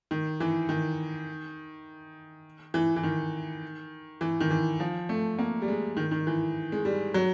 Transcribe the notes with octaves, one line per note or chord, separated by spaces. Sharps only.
D#3
E3
D#3
E3
E3
D#3
E3
D#3
E3
F3
A3
A#3
G3
G#3
D#3
D#3
E3
G#3
G3
F#3